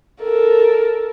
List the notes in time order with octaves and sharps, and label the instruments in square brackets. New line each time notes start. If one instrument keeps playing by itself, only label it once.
[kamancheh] A4 A#4